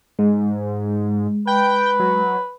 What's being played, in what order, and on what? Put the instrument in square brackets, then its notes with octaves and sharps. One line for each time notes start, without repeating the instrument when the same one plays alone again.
[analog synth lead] G#2 [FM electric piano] G#3
[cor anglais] B4 [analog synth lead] G5
[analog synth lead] F#3